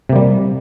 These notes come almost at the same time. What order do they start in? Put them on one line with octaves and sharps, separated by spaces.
C3 A#3 G3